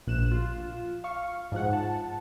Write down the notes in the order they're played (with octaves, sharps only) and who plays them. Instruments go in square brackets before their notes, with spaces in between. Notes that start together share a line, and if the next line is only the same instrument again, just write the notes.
[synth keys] A#1 F#6 E7
F4
F5 C#6
G#2 F3 F#5
A5